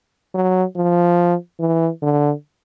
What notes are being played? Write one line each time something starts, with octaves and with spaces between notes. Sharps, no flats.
F#3
F3
E3
D3